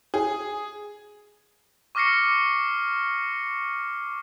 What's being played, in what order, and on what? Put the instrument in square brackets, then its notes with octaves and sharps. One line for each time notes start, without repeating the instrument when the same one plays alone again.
[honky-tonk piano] G#4
[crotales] C#6 D6 F6 A#6 C7 C#7